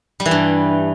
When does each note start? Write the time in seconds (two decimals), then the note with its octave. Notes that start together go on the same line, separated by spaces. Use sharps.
0.20 G3
0.26 E3
0.31 G2